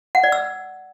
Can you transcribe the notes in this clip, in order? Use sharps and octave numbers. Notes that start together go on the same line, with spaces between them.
F#5
D5
E6